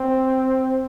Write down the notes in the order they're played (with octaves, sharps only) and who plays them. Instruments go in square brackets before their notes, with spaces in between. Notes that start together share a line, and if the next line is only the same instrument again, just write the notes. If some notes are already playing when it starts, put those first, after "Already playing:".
Already playing: [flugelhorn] C4